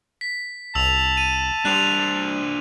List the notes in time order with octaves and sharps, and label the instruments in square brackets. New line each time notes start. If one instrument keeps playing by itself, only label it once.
[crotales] B6
[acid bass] C2 [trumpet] A5 [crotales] E6 F7
[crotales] D#7
[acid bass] G3 [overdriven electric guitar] D4 C5 [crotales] F#6 F7